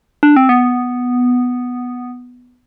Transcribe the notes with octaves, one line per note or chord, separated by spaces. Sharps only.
D4
C4
B3